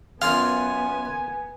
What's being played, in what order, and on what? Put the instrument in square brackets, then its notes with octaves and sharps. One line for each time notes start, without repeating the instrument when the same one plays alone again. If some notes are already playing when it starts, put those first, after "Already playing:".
[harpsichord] F#2 F4 G#4 [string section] B3 [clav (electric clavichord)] F5 [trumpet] G#5